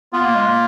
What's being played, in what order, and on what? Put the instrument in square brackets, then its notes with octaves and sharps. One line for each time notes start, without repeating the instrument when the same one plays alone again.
[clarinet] B3 [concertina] F4
[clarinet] A#3
G#3
A#3